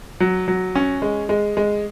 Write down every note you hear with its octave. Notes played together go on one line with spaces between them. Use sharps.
F#3
F#3
C#4
G#3
G#3
G#3